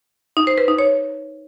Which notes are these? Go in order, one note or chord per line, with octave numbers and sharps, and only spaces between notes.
D#4
C5
B4
D#4
C#5